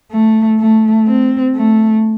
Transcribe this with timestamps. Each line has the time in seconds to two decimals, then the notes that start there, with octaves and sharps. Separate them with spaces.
0.12 A3
0.60 A3
1.08 C4
1.55 A3